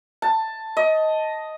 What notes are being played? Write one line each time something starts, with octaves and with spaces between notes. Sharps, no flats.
A5
D#5